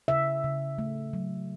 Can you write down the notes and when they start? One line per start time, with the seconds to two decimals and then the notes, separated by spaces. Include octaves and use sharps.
0.08 C#3 E5
0.44 C#3
0.78 A3
1.13 F#3